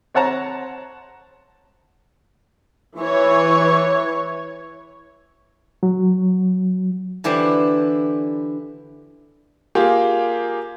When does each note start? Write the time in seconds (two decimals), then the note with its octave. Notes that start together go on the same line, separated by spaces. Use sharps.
0.14 C4 C#5 F#5 A5 A#5
2.98 E3 C#5
5.83 F#3
7.24 D3 E3 E4 G4 B4 C5
9.75 A#3 F4 G4 G#4